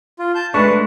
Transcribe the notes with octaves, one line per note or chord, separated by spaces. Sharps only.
F4
A5 G6
G#3 A3 D4 B4 A5 C#6